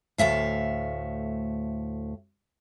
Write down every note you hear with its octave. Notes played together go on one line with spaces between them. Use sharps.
D2 A2 E5 F5